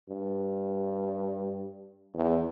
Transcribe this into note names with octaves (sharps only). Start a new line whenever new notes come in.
G2
E2